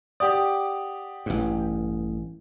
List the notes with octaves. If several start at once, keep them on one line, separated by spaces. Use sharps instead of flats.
G4 D5 F#5 D#6
A1 G2